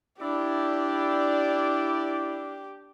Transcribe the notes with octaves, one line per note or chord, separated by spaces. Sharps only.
D4 E4 G4 D5